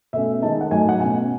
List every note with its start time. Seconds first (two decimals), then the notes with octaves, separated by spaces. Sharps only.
0.13 B2 A3 C#4 E5
0.42 D#3 G#3 D#4 A5
0.61 F#5
0.71 A2 F#3 A3 D#4 G#5
0.89 F#5
1.00 B2 A3 C#4 G#5